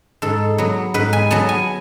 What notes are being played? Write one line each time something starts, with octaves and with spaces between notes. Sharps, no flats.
G#2 A4
F#3 B3
G#2 B4
G#5
F#3 B3 A5
G#5